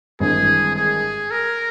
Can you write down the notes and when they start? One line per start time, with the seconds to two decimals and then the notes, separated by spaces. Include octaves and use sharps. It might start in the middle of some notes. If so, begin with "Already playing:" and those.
0.20 G#1 G2 E3 G#3 C4 G#4
0.76 G#4
1.31 A#4